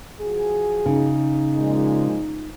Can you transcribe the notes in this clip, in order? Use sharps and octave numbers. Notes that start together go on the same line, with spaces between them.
F3 F#4 G#4
C#3 D#4
A#2 F3 G#3